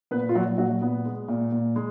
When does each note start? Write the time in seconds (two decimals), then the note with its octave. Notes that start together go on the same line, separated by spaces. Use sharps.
0.11 A#2 B3 B4
0.29 F4
0.35 A#2 F#3 F#4
0.58 A#2 F#3 F#4
0.82 A#2 B3
1.05 G#3
1.28 A#2
1.52 A#2
1.76 G#3